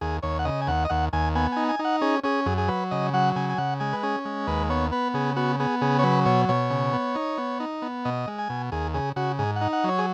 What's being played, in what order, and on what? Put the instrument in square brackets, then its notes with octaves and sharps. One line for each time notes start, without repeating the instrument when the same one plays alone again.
[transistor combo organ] D#2 G#4
D#2 C#5
F#5
C#3 D#5
G#5
D#2 F#5
D#5
D#2 F#5
D#2 G#5
B3 G#5
D#4 G#5
G#5
D#4
F#5
C#4 G#4
C#4 G#4
F#2 G#4
G#4
F#3 B4
C#3 D#5
F#3 F#5
C#3 G#5
G#5
C#3 F#5
G#3 G#5
B4
C#4 G#4
G#3
D#2 B4
B3 C#5
B3 B4
C#3 G#4
B3 F#4
B3 G#4
C#3 G#4
C#5
F#3 B4
B2 C#5
B2 C#5
C#3
B3
D#4
B3
D#4
B3
B2 D#5
G#3
G#5
B2
D#2 G#4
C#3 G#4
C#3 F#4
G#2 G#4
D#4 F#5
F#5
F#3 C#5
G#4